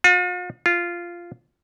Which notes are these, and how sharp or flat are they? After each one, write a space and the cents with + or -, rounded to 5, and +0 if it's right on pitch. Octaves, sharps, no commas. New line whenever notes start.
F4 +45
F4 -10